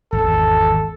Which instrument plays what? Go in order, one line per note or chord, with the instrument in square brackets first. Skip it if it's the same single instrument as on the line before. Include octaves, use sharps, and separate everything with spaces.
[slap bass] G#1 E2 [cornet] A4